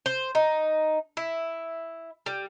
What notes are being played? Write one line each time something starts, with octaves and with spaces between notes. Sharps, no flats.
C5
D#4
E4
G3